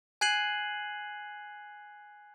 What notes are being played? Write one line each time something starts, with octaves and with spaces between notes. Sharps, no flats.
G#5 F#6 G#6 C7 D#7 F#7